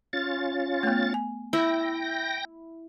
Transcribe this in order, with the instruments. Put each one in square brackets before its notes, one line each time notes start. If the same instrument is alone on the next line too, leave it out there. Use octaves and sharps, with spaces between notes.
[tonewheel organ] C#4 F4 A6
[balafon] A3 B3
G#5
[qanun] E4 [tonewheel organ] G5 A#6